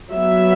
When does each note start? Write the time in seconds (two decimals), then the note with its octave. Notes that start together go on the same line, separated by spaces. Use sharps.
0.12 F#3 B3 E5